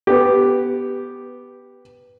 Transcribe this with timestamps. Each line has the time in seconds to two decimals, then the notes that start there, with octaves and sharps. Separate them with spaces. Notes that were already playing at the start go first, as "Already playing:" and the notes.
0.07 B3 G4